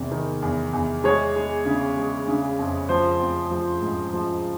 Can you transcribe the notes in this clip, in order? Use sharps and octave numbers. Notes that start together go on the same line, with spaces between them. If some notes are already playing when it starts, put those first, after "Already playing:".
Already playing: E2 C3 D#3
D#3
E2
E2
G#3 C#5
G#3
C#3
G#3
C#3
F2
F3 C5
C4
F3
G#2
F3